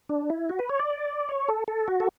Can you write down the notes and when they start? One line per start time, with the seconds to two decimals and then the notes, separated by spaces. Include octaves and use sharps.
0.09 D4
0.30 E4
0.49 F#4
0.59 B4
0.69 C#5
0.79 D5
1.29 C#5
1.48 A4
1.68 A4
1.88 F#4
2.00 A4